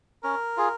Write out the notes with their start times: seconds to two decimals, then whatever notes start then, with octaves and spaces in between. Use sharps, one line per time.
0.24 C#4 A#4
0.57 F4 G#4